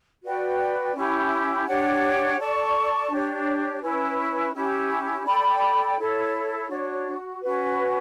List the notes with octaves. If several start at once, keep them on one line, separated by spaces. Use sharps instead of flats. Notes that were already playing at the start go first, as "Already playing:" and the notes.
F#4 B4 D5 G5
C#4 E4 G4
D4 G4 C#5 F#5
A4 D5 A5 C#6
D4 G4 C#5
C#4 E4 B4
C#4 E4 G4
A4 D5 G5 B5
E4 A4 C#5
D4 F#4 C#5
C#4 F#4 B4